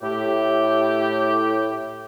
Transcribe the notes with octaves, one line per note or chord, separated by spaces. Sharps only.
A2 G4